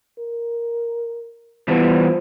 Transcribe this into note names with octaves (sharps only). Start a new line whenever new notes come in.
A#4
E3 F3 G3 B3